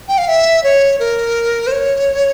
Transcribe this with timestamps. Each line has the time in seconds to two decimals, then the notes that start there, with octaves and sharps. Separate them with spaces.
0.08 G5
0.18 F5
0.28 E5
0.64 C#5
1.00 A#4
1.67 C5
1.72 C#5